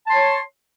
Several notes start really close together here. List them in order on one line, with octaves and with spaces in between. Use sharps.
A5 C6 C#5